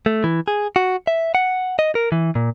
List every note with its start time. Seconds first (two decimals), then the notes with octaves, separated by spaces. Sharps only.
0.06 A3
0.24 E3
0.48 G#4
0.76 F#4
1.07 E5
1.35 F#5
1.79 D#5
1.95 A#4
2.12 E3
2.35 A#2